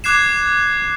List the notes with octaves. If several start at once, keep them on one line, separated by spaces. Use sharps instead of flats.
D6 F#6 G#6 C7 E7